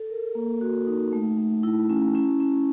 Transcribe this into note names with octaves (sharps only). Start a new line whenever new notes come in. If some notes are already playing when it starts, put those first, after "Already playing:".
Already playing: A4
A#4
A#3
F#4
D#4
A3
A3
E4
C#4
C#4
C#4